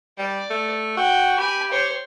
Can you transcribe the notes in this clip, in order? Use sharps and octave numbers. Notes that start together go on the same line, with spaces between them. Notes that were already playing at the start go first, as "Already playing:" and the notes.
G3 D5
A3
F#4 G5
G4 G#5 B5
C5 C#5